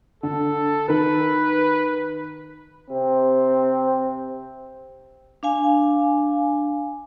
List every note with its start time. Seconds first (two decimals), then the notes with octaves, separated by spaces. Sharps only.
0.23 D3 A4
0.88 D#3 A#4 B4
2.90 C3 C4
5.43 D4 F5 G#5